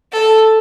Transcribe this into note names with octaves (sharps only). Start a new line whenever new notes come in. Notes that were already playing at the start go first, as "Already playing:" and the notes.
A4